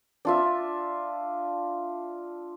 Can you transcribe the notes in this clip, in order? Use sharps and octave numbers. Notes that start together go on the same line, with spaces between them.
D4 F4 E5